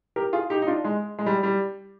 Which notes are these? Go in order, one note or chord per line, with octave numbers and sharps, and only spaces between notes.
G4 A#4
F4 G#4
D#4 G4
D#4
D4 F4
G#3
G#3
G3
G3